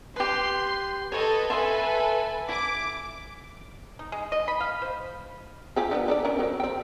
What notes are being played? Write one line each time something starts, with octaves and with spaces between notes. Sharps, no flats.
G4 B4 C6
A4 B4 C#5 D#5
A4 B4 E5 G#5 C6
E4 D6
D#4
G#3
D#5
B5
F5
C5
F4 G4 G#4
D3 A#3 B3
D4 C#5 D5
C#4 D4 A#4
F#3 C4
C4 G5